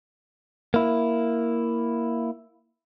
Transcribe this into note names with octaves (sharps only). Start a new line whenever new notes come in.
A#3 E4